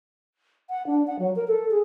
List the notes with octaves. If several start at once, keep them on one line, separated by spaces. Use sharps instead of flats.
F#5
D4
F#5
F#3
A#4
A4
G#4